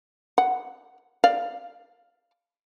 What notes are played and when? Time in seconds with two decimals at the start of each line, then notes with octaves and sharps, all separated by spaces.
0.38 F#5
1.24 D5 F5